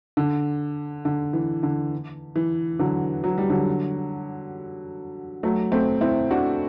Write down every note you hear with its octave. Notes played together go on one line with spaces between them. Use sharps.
D3
D3
E3
D3
E3
D3 F#3
F#3
G3
D3 F#3
F#3 A3
A3 C4
C4 E4
D4 F#4